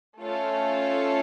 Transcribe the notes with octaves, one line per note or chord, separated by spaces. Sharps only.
A3 C#4 F4 A4 C#5